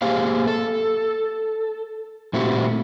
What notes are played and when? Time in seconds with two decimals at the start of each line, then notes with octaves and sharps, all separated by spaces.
0.02 A#3 G4 G#4 C5 F5
0.47 A4
2.33 A#2 A3 C4 E4 F#4 G4